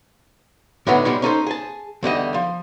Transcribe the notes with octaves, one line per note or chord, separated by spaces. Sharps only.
A2 D3 D#3 F#3 B3
B2 G3 G#3
C#4 D#4 A4 C5
G#4 A5
E2 D3 G3 D#5
F3